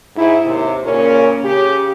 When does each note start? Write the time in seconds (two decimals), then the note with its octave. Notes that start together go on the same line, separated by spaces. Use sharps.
0.16 G#2 E4
0.45 D#2 C3
0.84 A#2 C#3 C#4 A#4
1.43 C#3 G4